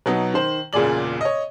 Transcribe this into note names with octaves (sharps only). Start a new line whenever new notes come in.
B2 F#3 B3 D#4
D#3 C5
E1 A#2 C#3 G#4 D5 F#7
C#5 D#5